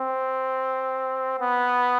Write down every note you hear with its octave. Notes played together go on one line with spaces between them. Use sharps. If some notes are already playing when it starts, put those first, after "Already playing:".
Already playing: C4
B3